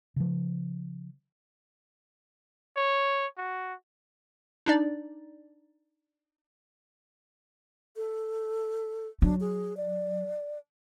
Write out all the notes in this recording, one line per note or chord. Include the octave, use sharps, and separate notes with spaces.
C#3 F3
C#5
F#4
D4 D#4 D5
A4
F#3 D4
G#4
D5